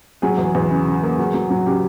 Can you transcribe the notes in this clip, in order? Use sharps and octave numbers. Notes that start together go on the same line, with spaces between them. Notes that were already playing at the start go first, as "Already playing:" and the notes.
F#3 G#4
E2
E2
C#3
C#3
A#3
F#3
F#3
F#3
C#3 G4